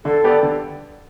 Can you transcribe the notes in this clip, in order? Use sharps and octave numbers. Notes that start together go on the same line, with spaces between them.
D3 A4
B3 G4 D5
D3